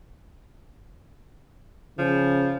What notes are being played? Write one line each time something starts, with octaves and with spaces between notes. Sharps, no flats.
C#3 F3